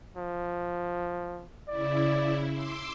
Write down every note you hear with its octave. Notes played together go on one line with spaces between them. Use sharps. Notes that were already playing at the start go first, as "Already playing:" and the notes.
F3
C#3 E4 D5
C6 D6 E6